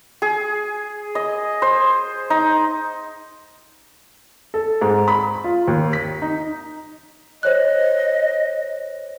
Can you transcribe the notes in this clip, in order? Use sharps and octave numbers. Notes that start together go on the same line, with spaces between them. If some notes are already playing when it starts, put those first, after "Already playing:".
G#4
D#5
C5
D#4
A4
G#2
B5
F4
D#2
B6
D#4
C5 C#5 D#5 F#6